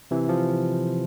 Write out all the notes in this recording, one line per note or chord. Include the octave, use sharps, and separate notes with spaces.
C3 E3
F3